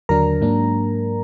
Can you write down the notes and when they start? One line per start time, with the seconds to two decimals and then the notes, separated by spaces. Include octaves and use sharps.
0.09 D#2 D3 F#3 D4 A#4 A#5
0.41 G#2 F#3 A#3 D4